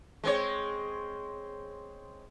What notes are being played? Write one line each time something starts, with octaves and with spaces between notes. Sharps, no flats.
G#3 C4 C#5